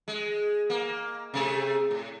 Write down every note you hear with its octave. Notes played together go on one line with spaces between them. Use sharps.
G#3
A#3
C3 A3 G#4
A2